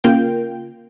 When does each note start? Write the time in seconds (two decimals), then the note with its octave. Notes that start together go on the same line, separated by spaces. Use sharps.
0.04 C#3 A#3 F4 G5